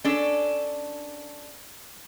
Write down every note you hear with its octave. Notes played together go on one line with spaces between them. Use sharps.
C#4 D4 A4